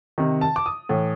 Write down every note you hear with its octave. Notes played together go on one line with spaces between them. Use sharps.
C3 D#3
A5
D6
D#6
A2 E3